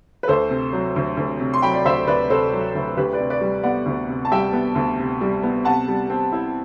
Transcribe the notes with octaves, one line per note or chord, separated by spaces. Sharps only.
B4
D2 A4 C5
C3
F#3
D2
D2
C3
C6
F#3 G5 B5
D5
D2 C5 E5
D2 B4 D5
C3 A4 C5
F#3
D2
D2 G4 B4
B4 D5
C3
B4 D5
G3
B3 D5 F#5
D2
C3
A5
G3 E5 G5
B3
D2
C3
G3
B3
C3 F#5 A5
G3
C4
E4